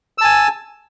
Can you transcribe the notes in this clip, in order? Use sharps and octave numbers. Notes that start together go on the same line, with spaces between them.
G#5 A5 E6